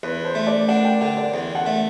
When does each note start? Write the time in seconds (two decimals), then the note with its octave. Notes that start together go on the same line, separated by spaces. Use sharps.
0.03 E2 B4
0.25 C5
0.35 A3
0.47 D5
0.68 D4 F#5
0.85 G5
1.01 D3 F#5
1.17 D5
1.34 E2
1.55 F#5
1.66 A3